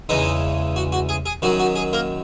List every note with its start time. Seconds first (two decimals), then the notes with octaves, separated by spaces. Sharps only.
0.09 E2 C#3 E3 G#3 D#4 D#5
0.76 F#4
0.92 F#4
1.09 G#4
1.26 G#4
1.42 F#2 D#3 F#3 F#4
1.60 F#4
1.76 G#4
1.93 A#3 A#4